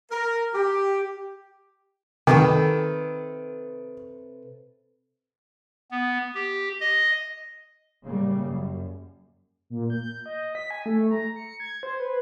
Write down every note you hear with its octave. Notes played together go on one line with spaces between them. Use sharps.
A#4
G4
C3 D#3 A4 B4
B3
G4
D#5
A2 C#3 G3 A#3
F#2
A#2
G6
D#5
B6
G#5
A3
A#5
C#7
G#6
C5
B4